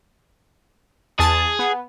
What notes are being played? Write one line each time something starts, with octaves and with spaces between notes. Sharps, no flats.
E2 G#4 A5 A6
B3